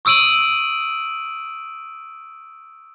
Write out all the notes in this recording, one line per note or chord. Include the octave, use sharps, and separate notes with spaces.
C#6 D#6 E6 D7 D#7 F#7